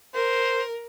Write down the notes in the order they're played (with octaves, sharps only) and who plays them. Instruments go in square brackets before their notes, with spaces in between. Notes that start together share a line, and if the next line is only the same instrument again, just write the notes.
[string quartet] A#4 [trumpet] C5